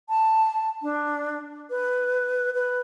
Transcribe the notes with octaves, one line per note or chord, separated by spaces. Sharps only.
A5
D4
B4
B4